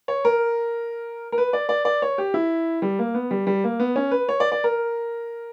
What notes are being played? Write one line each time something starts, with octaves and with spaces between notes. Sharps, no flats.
C#5
A#4
A#4
B4
D5
D5
D5
C#5
G4
E4
G3
A#3
B3
G3
G3
A#3
B3
C#4
B4
C#5
D5
D5
A#4